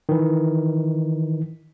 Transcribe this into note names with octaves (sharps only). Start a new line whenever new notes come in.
D#3 E3